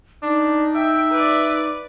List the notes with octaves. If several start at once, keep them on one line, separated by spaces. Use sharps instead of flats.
D4 D#4
E5 G5
B4 D5